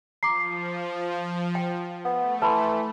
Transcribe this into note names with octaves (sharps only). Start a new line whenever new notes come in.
F3 A#5 D6 C7
G5
A3 B3
E3 B4 A5 B5 C6